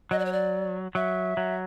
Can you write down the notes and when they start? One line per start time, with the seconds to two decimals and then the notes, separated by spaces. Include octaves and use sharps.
0.11 F#3 D#5
0.19 D5
0.25 C#5
0.33 D5
0.95 F#3 E5
1.37 F#3